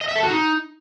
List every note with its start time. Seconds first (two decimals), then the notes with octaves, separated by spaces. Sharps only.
0.01 D#5
0.08 E5
0.16 A4
0.23 F#4
0.30 D#4